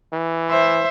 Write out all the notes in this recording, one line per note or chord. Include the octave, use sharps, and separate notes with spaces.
E3
C5 E5